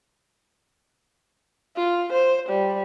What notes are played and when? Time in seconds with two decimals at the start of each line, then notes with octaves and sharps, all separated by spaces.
1.76 F4
2.13 C5
2.49 G3